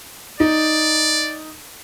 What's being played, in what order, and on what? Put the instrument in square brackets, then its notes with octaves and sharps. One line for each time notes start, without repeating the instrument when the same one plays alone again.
[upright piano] D#4 [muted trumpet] D5